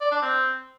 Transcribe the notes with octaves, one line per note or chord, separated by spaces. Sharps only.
D5
D4
C4